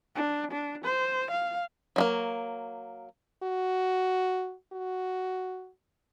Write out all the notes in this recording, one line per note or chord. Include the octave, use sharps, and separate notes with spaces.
D4
D4
C5
F5
F#3 A3 A#3
F#4
F#4